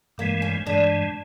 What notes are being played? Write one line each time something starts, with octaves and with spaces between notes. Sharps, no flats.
G2 E3 G#3 A#3
C#4
G2 E3 G#3 D4